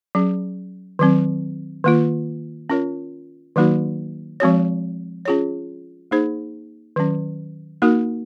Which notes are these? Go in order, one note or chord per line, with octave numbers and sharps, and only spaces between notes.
F#3 C#4 G#4
D#3 F#3 C4
D#3 A#3 F4
C#4 F4 A#4 C#5
D#3 F#3 A#3 D#4 F#4
F3 G#3 C4 F#4 C#5
C#4 F4 G#4 C#5
A#3 D#4 G#4 C5
D#3 F#3 C#4
A#3 D#4 F#4 A#4